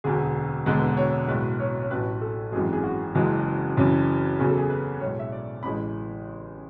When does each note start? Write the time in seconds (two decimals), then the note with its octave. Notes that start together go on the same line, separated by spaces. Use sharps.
0.04 E1 D2 D3 G#4
0.66 E1 E2 D3 G#3 B4
0.97 C#5
1.28 B1 A2 G#3 B4
1.60 C#5
1.82 C#5
1.90 A1 A2 F#3 B4
2.21 A4
2.52 G#1 F#2 E3 G#3 G#4
2.73 G#4
2.83 F#4
3.15 F#1 F#2 E3 G#3
3.77 F#1 F#2 C#3 E3
4.39 E2 C#3 F#3 G#4
4.49 A4
4.58 G#4
4.70 B4
5.00 B1 A2 G#3 C#5
5.19 E5
5.32 D5
5.63 A1 E3 G#3 B5